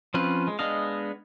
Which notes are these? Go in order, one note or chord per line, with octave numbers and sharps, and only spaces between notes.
F3 C4 C#4 F4 B4
G#3
G#3 B3 D4 D#5 F5